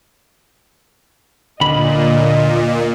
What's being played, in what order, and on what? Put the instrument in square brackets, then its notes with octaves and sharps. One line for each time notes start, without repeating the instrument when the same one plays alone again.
[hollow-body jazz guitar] D2 D3 B5 [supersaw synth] A#2 [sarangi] D#5